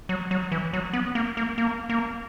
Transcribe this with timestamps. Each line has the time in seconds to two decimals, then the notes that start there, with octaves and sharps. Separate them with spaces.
0.09 F#3
0.31 F#3
0.52 E3
0.73 F#3
0.93 B3
1.15 A#3
1.37 A#3
1.58 A#3
1.90 A#3